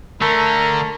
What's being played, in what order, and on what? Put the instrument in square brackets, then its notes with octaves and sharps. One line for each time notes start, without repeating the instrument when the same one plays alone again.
[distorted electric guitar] D3 [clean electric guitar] A3 [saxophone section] A#4 [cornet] A#5